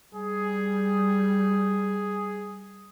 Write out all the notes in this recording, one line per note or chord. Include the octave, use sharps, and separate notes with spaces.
G3 G#4